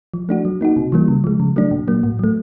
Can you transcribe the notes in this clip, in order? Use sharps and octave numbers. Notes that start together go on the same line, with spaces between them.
F3
A3 D4 F#4
F#3
A#3 D#4 F#4
C3
E3 G3 A#3
C#3
F3 G#3
C#3
F#3 A3 D4
A#2
F#3 A#3
A2
F#3 A3